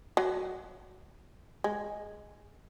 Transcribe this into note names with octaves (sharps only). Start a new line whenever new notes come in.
F#3
G#3